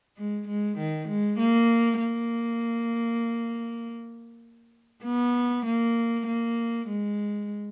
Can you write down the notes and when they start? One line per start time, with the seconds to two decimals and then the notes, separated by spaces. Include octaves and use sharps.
0.17 G#3
0.47 G#3
0.77 D#3
1.08 G#3
1.39 A#3
2.00 A#3
5.04 B3
5.66 A#3
6.27 A#3
6.88 G#3